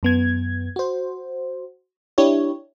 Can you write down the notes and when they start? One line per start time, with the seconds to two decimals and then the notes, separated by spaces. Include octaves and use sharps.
0.03 F#2 B3 G#6
0.76 F#4 C5
2.18 D4 E4 G4 C#5